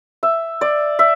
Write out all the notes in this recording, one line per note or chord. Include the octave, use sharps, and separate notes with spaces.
E5
D5
E5